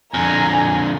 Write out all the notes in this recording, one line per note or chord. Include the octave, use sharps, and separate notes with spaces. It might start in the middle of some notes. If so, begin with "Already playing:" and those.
F2 D3 G#5 A#5